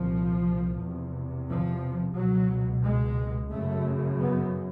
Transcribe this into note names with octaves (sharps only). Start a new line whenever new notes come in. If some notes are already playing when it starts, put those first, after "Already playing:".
Already playing: C2 A#2 F3
E2 C3
F3
C#2 B2 F#3
G#3
F#2 C#3 A3
B3